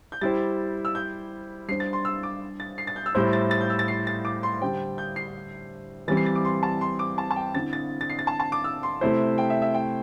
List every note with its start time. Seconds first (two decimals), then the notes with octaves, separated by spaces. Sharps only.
0.12 G6
0.21 G3 E4 G4 C5 A6
0.85 E6
0.95 G6
1.68 G3 D4 G4 C5 C7
1.80 A6
1.93 C6
2.05 E6
2.23 D6
2.60 A6
2.78 C7
2.87 A6
2.96 G6
3.06 E6
3.15 A2 G3 E4 C5 G6
3.33 A6
3.51 A6
3.61 G6
3.70 E6
3.79 A6
3.88 C7
4.07 A6
4.25 D6
4.43 C6
4.61 D3 G3 D4 G4 C5 G5
4.98 G6
5.16 C7
6.08 E3 G3 C4 A6
6.17 C7
6.26 A6
6.36 D6
6.45 C6
6.63 A5
6.81 C6
6.99 D6
7.18 A5
7.31 A5
7.36 G5
7.55 D3 C4 E4 A6
7.73 A6
8.01 A6
8.10 C7
8.19 A6
8.27 A5
8.40 A5
8.52 D6
8.64 E6
8.83 C6
9.01 C3 A3 E4 C5
9.38 G5
9.50 E5
9.62 E5
9.74 G5